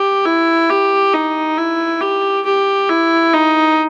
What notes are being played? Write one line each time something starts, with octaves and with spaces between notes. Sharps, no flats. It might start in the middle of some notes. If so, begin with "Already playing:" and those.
Already playing: G4
E4
G4
D#4
E4
G4
G4
E4
D#4